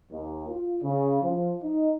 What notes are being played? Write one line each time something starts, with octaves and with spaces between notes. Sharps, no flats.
D#2
F4
C#3
F3
D#4